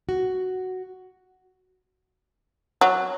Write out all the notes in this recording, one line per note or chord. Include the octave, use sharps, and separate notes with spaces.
F#4
F#3